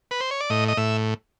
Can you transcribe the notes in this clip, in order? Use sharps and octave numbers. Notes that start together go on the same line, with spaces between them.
B4
C5
C#5
D5
A2 D#5
D#5
A2 E5